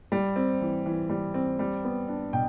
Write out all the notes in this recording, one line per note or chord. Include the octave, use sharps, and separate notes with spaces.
G3
C4
E3
E3
G3
C4
G3
B3
D4
B2 G5